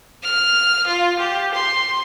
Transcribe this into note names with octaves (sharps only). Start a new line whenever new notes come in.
F6
F4
G4
C6